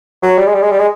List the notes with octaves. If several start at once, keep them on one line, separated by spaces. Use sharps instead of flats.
F#3
G3
G#3
G3
G#3
G3
G#3